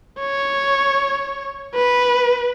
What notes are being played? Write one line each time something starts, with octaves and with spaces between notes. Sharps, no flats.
C#5
B4